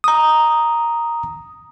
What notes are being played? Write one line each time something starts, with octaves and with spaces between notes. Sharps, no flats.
A#5 D#6